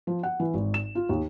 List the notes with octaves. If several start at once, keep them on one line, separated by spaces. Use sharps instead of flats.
F3
F#5
E3
G#1
E7
F4
D#2